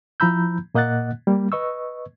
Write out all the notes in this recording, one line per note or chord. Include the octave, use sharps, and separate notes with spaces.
F3 E4 A#5 B5 E6 G6
A#2 A#3 D#5 F#5 F#6 A6
G3 A#3
B4 D#5 C#6 E6